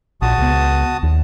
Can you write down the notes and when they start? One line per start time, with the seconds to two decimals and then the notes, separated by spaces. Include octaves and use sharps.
0.22 A#1 F#4 A5 D#6
0.38 C#2 B3
1.03 D#2